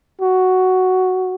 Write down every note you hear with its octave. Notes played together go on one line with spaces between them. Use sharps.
F#4